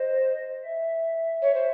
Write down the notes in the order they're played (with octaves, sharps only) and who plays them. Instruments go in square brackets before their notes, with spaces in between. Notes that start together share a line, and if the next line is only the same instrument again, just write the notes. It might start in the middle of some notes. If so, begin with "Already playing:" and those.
Already playing: [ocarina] C5 [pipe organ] D#5
[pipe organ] E5
[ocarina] C#5
C5